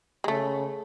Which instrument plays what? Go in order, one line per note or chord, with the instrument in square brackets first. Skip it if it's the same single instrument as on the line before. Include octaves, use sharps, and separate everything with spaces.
[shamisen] G#3
[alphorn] C#3 [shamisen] A3